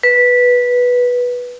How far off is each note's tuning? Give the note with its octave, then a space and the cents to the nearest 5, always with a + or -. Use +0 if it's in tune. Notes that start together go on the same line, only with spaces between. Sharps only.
B4 -10